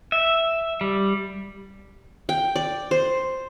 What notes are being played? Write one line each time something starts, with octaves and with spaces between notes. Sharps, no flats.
E5
G3
G5
D5
C5